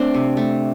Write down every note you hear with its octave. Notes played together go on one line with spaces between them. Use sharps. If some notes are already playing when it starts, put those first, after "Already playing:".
Already playing: A3 C4 D4
C3
A3